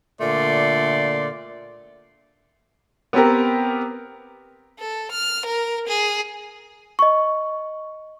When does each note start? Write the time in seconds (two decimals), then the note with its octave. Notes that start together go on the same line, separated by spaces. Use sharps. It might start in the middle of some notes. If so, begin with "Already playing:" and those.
0.21 A#2 D3 A3 D5 C6
3.13 B3 C4 G4 A#4
4.79 A4
5.11 F6
5.45 A#4
5.87 G#4
6.99 D#5 C#6